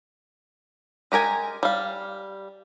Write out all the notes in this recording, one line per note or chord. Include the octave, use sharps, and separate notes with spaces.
G#3 G4 A#4 G#5
G3 F5